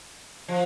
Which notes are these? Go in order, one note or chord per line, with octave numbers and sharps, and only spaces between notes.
F3